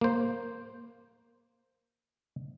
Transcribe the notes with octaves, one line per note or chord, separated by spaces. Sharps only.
A#3 C5